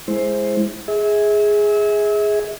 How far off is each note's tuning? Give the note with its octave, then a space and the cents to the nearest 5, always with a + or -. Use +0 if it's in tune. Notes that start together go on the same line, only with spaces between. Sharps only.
G#3 +0 E4 +0 C5 +10
G#4 +0 E5 -35